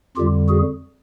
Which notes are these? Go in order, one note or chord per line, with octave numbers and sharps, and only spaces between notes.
F2 D3 G3 F4 G4
F#4 G#4